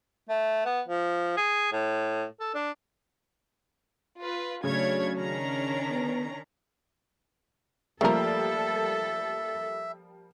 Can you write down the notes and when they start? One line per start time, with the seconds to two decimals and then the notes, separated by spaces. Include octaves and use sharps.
0.29 A3
0.65 B3
0.88 F3
1.37 G#4
1.72 A2
2.40 A4
2.54 D4
4.19 F4 B4
4.64 C#3 F#3 A3 D4 C#5 G#6
5.16 D#3 C#4 D4 A#5
5.90 B3
8.01 F3 G3 A3 A#3 A4 A#4 E5